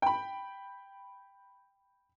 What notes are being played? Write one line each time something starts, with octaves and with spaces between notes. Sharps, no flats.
G5 B5